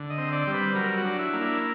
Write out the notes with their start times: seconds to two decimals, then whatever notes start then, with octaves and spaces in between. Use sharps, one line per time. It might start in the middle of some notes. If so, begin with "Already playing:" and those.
Already playing: D3
0.10 D#5
0.18 C4
0.32 D5
0.47 G3
0.54 B4
0.75 F#3 A#4
0.97 F#4
1.05 D4
1.19 E4
1.33 A#3
1.41 E4